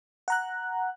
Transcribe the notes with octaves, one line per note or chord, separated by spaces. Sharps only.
F#5 A#5 F#6